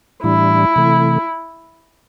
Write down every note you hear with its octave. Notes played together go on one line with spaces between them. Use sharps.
A2 E3 G3 D4 E4
C3 E3 A3